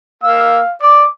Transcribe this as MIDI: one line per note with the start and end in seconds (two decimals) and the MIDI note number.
0.23 0.60 58
0.23 0.74 77
0.23 0.60 88
0.82 1.02 74
0.82 1.10 86